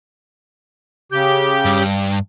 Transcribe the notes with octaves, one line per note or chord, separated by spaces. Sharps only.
C#3 G4 G6
G2